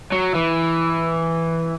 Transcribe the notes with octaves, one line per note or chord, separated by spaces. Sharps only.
F#3
E3